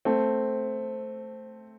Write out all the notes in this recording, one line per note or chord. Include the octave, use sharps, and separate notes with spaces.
A3 C4